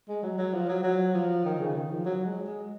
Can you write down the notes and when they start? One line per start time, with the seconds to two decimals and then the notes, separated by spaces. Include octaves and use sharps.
0.08 G#3
0.23 F#3
0.38 F#3
0.54 F3
0.69 F#3
0.83 F#3
1.14 F3
1.45 D#3
1.59 C#3
1.75 D#3
1.91 F3
2.05 F#3
2.25 G#3
2.46 G#3